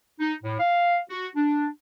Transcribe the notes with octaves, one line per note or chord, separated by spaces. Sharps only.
D#4
A2
F5
F#4
D4